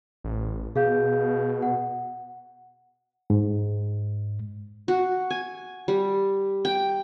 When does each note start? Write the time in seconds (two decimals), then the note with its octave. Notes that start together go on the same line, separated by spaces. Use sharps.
0.24 A1
0.76 B2 G#4 F5 G6
1.62 F#5
3.30 G#2
4.88 F#4
5.30 G#5
5.88 G3
6.65 G5